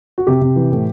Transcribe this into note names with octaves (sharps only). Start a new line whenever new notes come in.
F#4
C3 G4
C3
E3
A2